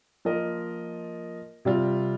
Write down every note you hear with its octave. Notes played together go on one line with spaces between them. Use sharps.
F3 A#3 F4 A#4 D#5
C3 G3 C4 F4